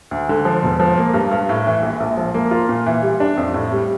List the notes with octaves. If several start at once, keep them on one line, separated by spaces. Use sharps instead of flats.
D2
D3
F3
E1
F3
A#3
G2
G2
A2
E3
A#1
A#1
F3
A#3
F4
A#2
E3
G3
D4
F2
A2
G3